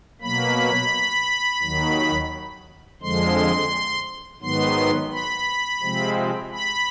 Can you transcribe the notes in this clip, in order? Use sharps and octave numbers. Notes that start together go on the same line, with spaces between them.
B2 F#3 A#3 B5
D#2 D#3 F#3
F2 D3 F3 G#3 C6
G#2 D#3 F#3 B3 C6
B5
C3 F3 G#3 C4
B5